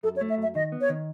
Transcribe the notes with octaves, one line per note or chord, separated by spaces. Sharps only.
F#2 A4
C#5
A3
E5
F#2
E5
D#3 D#5
B3
C#5
D#3